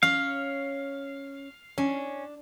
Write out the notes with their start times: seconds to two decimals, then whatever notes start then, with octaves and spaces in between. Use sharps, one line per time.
0.03 C#4 C#5 F5
1.78 C#4 D4